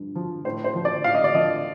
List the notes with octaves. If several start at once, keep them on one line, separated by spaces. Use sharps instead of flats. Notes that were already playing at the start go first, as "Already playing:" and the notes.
Already playing: G2 F3
F3
A2 C5
C5
F3
D5
A2 F5
D#5
D5
F3 D#5